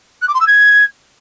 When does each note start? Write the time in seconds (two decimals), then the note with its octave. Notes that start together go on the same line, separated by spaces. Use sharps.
0.21 F#6
0.28 D6
0.34 C6
0.40 E6
0.47 G#6